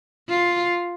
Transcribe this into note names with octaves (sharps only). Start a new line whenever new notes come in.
F4